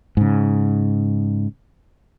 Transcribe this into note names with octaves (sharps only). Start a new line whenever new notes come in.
G#2 C#3